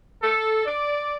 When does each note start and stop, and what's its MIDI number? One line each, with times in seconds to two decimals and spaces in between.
0.23 0.65 69
0.66 1.15 74